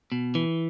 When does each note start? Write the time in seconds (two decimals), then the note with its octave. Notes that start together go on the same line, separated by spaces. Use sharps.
0.12 B2
0.35 E3